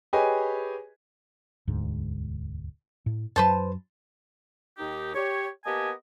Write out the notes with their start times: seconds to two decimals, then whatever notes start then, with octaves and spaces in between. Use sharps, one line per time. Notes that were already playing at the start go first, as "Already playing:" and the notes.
0.13 G4 G#4 B4 C#5 D#5 G#5
1.67 E1 D2 G#2
3.06 A2
3.36 F#2 F#3 B4 C5 A5
4.78 D#2 D#4 G4
5.15 G4 C#5
5.65 A#3 B3 G4 D#5 G#5 A5